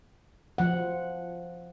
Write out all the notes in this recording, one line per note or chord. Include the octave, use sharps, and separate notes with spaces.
F3 F#5